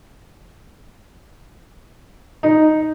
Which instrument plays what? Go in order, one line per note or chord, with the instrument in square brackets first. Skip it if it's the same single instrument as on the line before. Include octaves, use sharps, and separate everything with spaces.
[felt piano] D#4